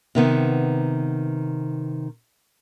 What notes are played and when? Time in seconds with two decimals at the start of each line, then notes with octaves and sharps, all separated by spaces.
0.15 C3 D#3 B3